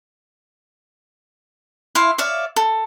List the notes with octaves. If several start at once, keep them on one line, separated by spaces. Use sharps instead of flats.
E4 E5 F5 C6
C#5 D5 E5 F5
A4